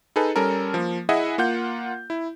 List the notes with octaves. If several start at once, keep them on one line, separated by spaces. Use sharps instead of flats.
D#4 G#4 A4 B4
G3 C#4 A4 A#4
F3 A#3
E4 G#4 D#5 E5 F#5 G#5
A#3 F4 F#5 G6
E4